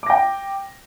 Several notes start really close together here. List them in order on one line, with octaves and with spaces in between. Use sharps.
D6 A#6 G5